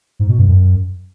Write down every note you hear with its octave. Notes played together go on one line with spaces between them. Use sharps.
G#2
B2
G2
F#2